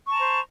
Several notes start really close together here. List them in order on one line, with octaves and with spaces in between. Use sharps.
C#6 A5 A#5 C5